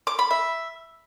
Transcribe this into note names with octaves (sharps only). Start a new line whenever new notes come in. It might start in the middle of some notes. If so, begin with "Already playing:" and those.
D6
B5
E5